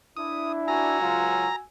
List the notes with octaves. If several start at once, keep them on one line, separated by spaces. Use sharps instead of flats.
D4 E4 D#6
F#4 G#5 A#5 E6
C#2 F#3 F4